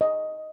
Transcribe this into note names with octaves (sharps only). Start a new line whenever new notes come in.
D#5